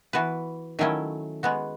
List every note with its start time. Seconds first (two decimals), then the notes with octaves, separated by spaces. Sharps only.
0.13 E3 B3 F#4 B4
0.79 D#3 F#3 A3 C#4 E4
1.43 G#3 B3 F#4